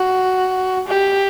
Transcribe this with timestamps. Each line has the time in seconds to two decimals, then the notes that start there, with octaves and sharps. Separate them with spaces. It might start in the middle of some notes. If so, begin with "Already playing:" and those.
Already playing: F#4
0.88 G4